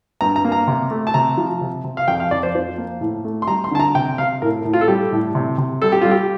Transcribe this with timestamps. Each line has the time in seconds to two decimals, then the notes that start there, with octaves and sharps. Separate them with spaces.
0.21 G2 A#5
0.36 A#5
0.45 A#3
0.52 A#5
0.68 C3
0.91 A3
1.07 A5
1.14 C3 A#5
1.38 F3
1.61 C3
1.84 C3
1.97 F5
2.08 F2 G5
2.20 F5
2.31 F2 D5
2.43 C5
2.55 F3 C5
2.78 A#3
3.01 A2
3.24 A3
3.42 C6
3.48 G3 A#5
3.64 C6
3.71 D3 A5
3.80 A#5
3.95 C3 G5
4.18 C3 F5
4.42 A2 A#4
4.65 A2
4.73 F4
4.81 A4
4.88 G3 G4
5.12 A2
5.35 C3
5.58 C3
5.82 G3 A4
5.92 G4
6.01 G3 F4
6.11 G4